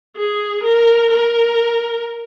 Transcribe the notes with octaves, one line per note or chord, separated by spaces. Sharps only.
G#4
A#4
A#4